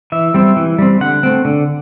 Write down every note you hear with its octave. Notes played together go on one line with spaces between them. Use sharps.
E3 E5
G3 C4
E3
G3 C4
D3 F#5
A3 C4
D3